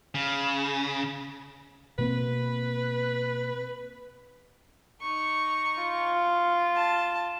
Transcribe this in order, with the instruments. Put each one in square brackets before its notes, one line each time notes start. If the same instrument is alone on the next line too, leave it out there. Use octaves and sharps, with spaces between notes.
[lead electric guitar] C#3
[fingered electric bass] B2 A#3 C4 [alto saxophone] B4
[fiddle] D#4 C#6
[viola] F4
[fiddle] A5